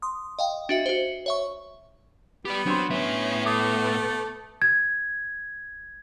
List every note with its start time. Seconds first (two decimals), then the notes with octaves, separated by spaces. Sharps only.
0.02 C6 D#6
0.39 D#5 F5 G5
0.69 D4 F#4 E5
0.86 F#4 C5
1.26 C#5 E5 C#6
2.45 B3 G4 D5
2.66 F#3 C4 D4 C6
2.90 A2 B3 C#4 E5
3.46 A3 D6 D#6
4.62 G#6